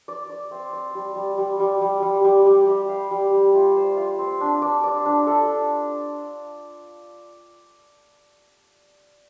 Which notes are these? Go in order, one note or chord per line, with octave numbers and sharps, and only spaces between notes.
D5
D5
C4
D5
G3
G3
G3
G3
G3
G3
G3
G3
G4
F5
G3
G3
F4
C5
F4
C4
D4
D5
D5
D4
A4